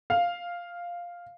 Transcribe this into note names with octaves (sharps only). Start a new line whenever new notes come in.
F5